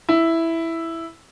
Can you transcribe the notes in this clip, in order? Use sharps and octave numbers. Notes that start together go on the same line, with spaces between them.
E4